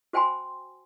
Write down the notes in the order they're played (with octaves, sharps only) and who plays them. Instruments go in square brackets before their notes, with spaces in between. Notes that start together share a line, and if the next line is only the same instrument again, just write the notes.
[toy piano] F#4 C5 G5 G#5 B5 C6